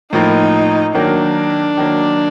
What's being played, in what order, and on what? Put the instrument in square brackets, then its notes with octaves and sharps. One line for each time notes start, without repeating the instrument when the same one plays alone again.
[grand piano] A2 F3 A#3 [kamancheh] D#4
[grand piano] D#3 F#3 A#3 [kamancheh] D4
[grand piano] D#3 F#3 A#3